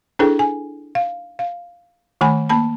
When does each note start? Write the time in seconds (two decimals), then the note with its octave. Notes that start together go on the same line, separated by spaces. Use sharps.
0.19 D4 E4 G#4 A4 B4 G5
0.39 G#5
0.95 F5
1.39 F5
2.21 D#3 A3 G#5 B5
2.49 A#3 A5 B5